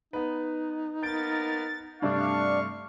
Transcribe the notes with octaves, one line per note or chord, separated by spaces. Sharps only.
B3 D#4 B4
A#3 B3 A#4 G6 A6 D7
G2 C3 A3 D4 F5 C#6